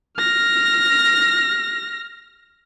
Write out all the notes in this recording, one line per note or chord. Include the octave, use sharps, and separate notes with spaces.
F6 A#6